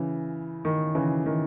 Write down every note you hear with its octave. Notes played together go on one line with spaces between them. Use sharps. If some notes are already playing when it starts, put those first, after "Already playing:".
Already playing: C#3 E3
D#3
C#3 E3
D#3